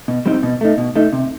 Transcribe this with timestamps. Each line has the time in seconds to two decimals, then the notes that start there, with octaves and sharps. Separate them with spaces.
0.08 B2
0.26 G3 C4 D#4
0.43 B2
0.61 A3 D#4
0.78 B2
0.95 A3 D#4
1.13 C3